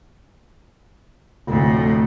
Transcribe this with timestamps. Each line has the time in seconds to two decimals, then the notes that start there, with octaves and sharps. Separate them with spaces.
1.47 F1 D2 A2